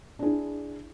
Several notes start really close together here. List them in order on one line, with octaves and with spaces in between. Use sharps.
D4 G#4 E4